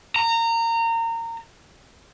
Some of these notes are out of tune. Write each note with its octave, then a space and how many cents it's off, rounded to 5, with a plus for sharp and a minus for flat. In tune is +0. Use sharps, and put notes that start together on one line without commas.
A#5 -25